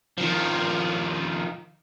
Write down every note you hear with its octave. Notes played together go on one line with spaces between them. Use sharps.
D#3 F3